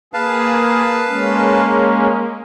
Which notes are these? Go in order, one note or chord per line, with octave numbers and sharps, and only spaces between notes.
A#3 G#4 B4 F5 A5
G#3 A#3 C#4